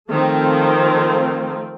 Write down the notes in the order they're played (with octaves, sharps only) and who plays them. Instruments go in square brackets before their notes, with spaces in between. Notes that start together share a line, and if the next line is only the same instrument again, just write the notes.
[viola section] D#3 F3 A3 C4 F4